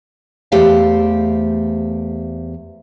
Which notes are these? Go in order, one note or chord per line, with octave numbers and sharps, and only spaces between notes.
E2 A3 G4 C5 F5